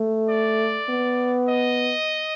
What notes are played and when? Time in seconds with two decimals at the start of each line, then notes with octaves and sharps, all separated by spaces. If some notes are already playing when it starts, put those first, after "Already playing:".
Already playing: A3
0.30 D5
0.89 B3
1.49 D#5